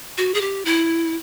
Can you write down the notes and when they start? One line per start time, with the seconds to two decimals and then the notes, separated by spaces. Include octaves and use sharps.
0.18 F#4
0.34 G#4
0.41 G4
0.65 E4